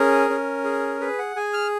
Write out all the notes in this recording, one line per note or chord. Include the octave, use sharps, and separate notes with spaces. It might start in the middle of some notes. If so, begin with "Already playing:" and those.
Already playing: C#4 G#4 A#4
C#4
G#4
G#4 B4
F#5
G#4 G#5
F6